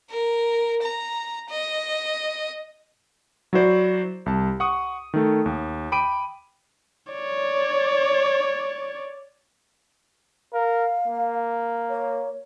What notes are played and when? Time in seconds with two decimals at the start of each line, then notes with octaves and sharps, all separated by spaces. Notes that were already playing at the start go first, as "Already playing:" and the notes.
0.10 A#4
0.82 A#5
1.49 D#5
3.53 F#3 E4 F#4 C5 D5
4.26 C2 A5
4.60 F#5 C#6 D#6
5.14 D#3 A3
5.46 D#2
5.92 G5 B5 D6 D7 D#7
7.13 C#5 D5
10.53 A#4 F5
11.07 A#3
11.89 C#5